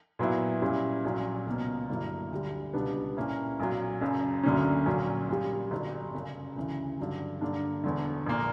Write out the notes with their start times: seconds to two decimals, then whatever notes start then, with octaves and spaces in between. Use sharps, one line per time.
0.19 A#2 F#3 B3 E4
0.62 A#2 G3 C#4 E4
1.04 A#1 A#2 F#3 C#4
1.46 C#2 B2 A#3
1.90 G1 G2 F#3 A#3 E4
2.32 D2 D3 G3
2.74 C#2 B2 G3 B3 D4
3.17 A#2 A#3 C#4 E4
3.60 B1 A#2 F#3
4.01 F#1 F#2 C#3
4.43 D2 D3 F#3 A#3 C#4
4.86 A#1 A#2 F#3 C#4
5.29 A#1 A#2 G3
5.71 G1 G2 F#3
6.14 F#1 F#2 C#3
6.56 D2 C#3 E3
6.99 G2 D3 F#3
7.41 G2 D3 A#3 D4
7.84 E1 E2 D3
8.27 A#1 A#2 A#3